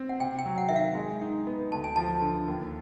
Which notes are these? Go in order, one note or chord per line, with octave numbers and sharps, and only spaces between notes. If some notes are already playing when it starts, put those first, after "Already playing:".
Already playing: C4
F#5
C3 G5
G5
F#3
F#5
D#3 E5
F5
G#3
D#4
B3
D2 A5
G#5
F3 A5
D3
D#2